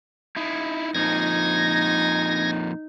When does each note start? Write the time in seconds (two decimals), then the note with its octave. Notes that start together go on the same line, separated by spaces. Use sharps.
0.36 D#4 E4
0.95 F2 A#2 D#4 G#6 A#6